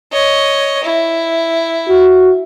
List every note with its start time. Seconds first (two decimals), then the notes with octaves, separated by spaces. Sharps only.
0.13 C#5 D#5
0.84 E4
1.89 F#4